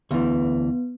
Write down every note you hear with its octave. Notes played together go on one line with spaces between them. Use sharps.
D2 E3 B3